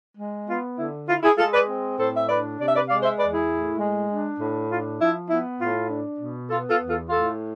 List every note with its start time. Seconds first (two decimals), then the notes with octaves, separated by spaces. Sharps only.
0.17 G#3
0.47 B3 F4
0.78 D3 E4
1.07 E4 F4
1.23 E4 G#4
1.37 G#3 F4 A4
1.53 B4 D5
1.67 C4
1.98 A2 A4 C5
2.17 E5
2.28 D4 B4 D5
2.58 C3 D5
2.67 E5
2.74 B4 D5
2.88 G#3 D5 F5
3.03 C5 E5
3.18 E2 B4 D5
3.33 E4 G#4
3.48 A2
3.79 G#3
4.09 D4
4.39 A2
4.68 D4 F4
4.99 F3 E4
5.29 B3 E4
5.59 A2 F4
5.89 D4
6.19 B2
6.49 B3 F4 A4
6.69 F4 A4
6.79 E2
6.90 F4 A4
7.09 A2 F4 A4